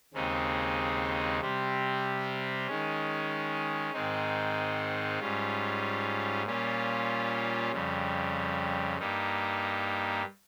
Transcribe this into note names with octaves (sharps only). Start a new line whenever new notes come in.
D#2 C#3 G#3 C4 D#4
C3 G3 C4
D#3 G#3 C#4
G#2 D#3 G#3 C4 D#4
G#2 G3 C#4 F4
A#2 G3 C#4 F4
F2 C#3 G3
G2 G3 A#3 D#4